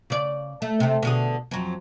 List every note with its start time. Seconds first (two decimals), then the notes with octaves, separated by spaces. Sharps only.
0.10 C#3 D5
0.62 A3
0.80 C3 A3
1.03 B2 D3 G#4
1.51 F2 F#3